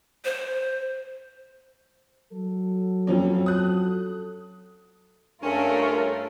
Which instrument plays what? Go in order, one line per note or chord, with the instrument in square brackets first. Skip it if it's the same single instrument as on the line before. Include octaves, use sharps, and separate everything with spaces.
[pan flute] C5
[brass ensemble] F#3 A4
[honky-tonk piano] F2 F3 C#4
D#6 F#6
[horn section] G2 C#4 [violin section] A3 F4 [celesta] D4 G#5 [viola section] A#4